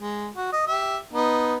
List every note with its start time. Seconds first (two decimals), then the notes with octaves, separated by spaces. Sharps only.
0.02 G#3
0.35 F#4
0.53 D#5
0.67 G4 E5
1.13 B3 D#4